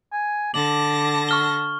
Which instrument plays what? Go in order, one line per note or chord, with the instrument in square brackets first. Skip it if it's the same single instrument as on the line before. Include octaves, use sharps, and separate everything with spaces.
[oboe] G#5
[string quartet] D3 A5 A#6 [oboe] D6 [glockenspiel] F#7
[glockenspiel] C#6 F6 G7